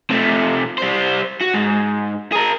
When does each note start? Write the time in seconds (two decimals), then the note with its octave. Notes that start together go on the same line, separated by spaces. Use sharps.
0.10 C3 A3
0.78 G3 C5
1.41 F#4
1.54 G#2
2.33 G#4 A#4